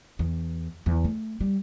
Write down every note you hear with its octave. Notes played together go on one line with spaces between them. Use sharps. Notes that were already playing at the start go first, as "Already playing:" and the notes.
E2
E2
A3
G3